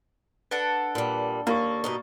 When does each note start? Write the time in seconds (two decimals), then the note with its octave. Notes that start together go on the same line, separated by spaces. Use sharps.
0.51 D4 A4 B4 F#5
0.95 A#2 G3
1.47 D#2 A#3 D5 C#6
1.84 G2 B2 D#4